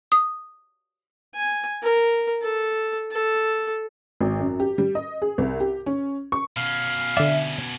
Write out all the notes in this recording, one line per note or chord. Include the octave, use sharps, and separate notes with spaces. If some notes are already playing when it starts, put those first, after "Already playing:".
D#6
G#5
A#4
A4
A4
G#1
F#2
G4
G3
D#5
G#4
C2
G4
C#4
C#6
B2 C#4 F5
D3 D5 E5